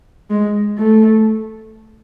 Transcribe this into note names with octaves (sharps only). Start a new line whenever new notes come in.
G#3
A3